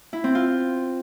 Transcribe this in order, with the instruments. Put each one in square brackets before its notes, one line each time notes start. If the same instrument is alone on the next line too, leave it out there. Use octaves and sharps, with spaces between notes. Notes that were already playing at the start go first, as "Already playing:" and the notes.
[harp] E4
C4
F4